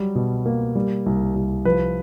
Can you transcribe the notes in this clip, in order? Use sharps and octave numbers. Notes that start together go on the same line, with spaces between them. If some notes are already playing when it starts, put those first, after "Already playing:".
Already playing: F#3 G3
B2
A#3
G3
C2
C2
F3 B4